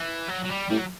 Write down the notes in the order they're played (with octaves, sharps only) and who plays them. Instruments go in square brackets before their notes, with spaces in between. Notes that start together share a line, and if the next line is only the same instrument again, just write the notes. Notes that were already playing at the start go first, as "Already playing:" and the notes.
Already playing: [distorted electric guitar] E3
F#3
F#3
G3
[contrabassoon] A2 [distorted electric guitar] G3
[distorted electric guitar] F#3